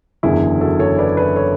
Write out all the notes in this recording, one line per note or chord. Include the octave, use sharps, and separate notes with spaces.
F#1 E2 D3 E4 G#4
F#4 A4
A4 C#5
B4 D5
B4 D5
A4 C#5